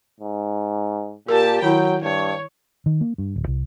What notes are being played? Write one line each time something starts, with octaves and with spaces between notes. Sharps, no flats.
G#2
A#2 G4 A#4 A5
D#3 F#3 E4 G5
G2 C#5
D#3
A#3
G2
D1
C2